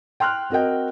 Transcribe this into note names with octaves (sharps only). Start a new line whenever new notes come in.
G5 C6 F6 F#6
C4 F#4 A#4 D#5 G5